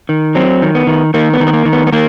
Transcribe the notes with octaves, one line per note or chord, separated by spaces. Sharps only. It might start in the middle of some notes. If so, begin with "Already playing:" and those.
D#3
F#3 C4
D#3
B3
D#3
D#3 A#3
B3
D#3
B3
A#3
D#3
B3
B3
D#3 A#3